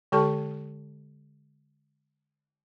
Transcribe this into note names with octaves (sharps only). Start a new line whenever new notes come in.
D3 G#3 G4 A4 A5 C#6